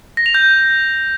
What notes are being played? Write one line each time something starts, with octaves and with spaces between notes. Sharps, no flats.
A#6
F7
G6